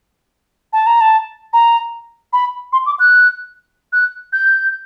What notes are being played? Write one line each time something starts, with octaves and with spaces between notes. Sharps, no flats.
A5
A#5
A5
A#5
B5
C6
D6
F#6
F#6
G6